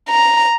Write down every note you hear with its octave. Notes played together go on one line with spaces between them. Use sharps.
A#5